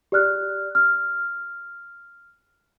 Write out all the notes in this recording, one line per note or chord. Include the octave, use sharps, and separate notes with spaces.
G4 D5 F6 F#6
F6